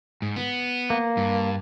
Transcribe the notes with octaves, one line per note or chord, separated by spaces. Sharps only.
G#2
B3
A#3
G2